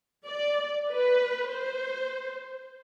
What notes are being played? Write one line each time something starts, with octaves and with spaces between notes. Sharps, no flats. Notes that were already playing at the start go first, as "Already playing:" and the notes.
D5
B4
C5